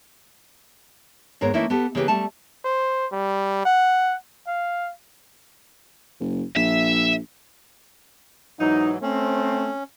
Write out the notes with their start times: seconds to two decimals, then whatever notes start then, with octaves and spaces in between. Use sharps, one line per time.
1.41 D#2 G#2 B3 A#4 C#5
1.53 E3 A3 A#3 C#4 D#4 E4
1.70 B3 G4 A4
1.95 C#3 E3 A#3 G4 B4
2.08 G3 A3 A5
2.65 C5
3.12 G3
3.65 F#5
4.47 F5
6.20 F#1
6.57 A#1 E5
8.60 G#2 E3 F#3 D#4
9.02 A3 C4 C#4